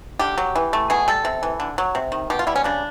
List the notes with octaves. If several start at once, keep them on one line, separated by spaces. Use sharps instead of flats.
D3 G4
F#3
E3
A3
B2 G#4
G3 A4
C3
E3
D3
F#3
C3
D#3
B2 G4
F4
G3 E4
C#4
C#3 D4